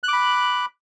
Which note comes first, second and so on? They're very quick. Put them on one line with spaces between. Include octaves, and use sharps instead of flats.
F#6 D6 B5